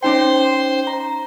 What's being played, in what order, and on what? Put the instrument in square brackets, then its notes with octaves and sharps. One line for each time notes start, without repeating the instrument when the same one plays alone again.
[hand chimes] C#4 D#4 G5 [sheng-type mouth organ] C5 C6
[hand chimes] A#5